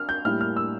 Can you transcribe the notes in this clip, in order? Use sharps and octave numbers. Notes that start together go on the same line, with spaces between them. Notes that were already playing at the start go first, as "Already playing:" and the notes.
Already playing: D4 F6
G6
A2 G3 A#3 E4 F6
F6
E6